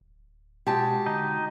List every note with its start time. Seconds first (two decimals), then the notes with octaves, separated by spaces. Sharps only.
0.01 D1
0.67 B2 G#3 F#4 G4 A5
1.06 D3 D#4